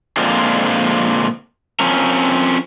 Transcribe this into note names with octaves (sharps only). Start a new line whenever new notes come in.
A#2 D3 F3 G#3 C4 F4
F3 C4 C#4 A#4